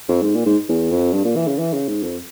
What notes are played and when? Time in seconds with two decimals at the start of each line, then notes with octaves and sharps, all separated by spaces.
0.08 F2
0.22 G#2
0.35 A#2
0.46 G#2
0.69 E2
0.91 F2
1.13 G2
1.24 A#2
1.36 E3
1.47 C#3
1.59 E3
1.73 C#3
1.88 G#2
2.03 F2